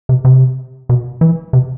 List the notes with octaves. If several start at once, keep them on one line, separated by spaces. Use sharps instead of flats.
C3
C3
B2
E3
C3